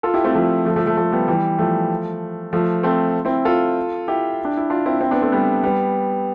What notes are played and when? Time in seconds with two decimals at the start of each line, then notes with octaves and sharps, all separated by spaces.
0.03 F4 A4
0.14 E4 G4
0.24 A3 C4
0.35 F3 A3
0.65 F3 A3
0.76 F3 A3
0.86 F3 A3
0.97 F3 A3
1.12 G3 B3
1.28 E3 G3
1.59 F3 A3
2.53 F3 A3
2.83 A3 C4
3.25 C4 E4
3.45 F4 A4
4.08 E4 G4
4.45 D4
4.57 E4
4.70 D4 F4
4.86 C4 E4
5.01 C4 E4
5.11 B3 D4
5.22 A3 C4
5.32 G3 B3
5.64 G3 B3